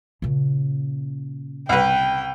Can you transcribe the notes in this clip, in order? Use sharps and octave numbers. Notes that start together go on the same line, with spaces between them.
A#2 C#3
C2 B4 G5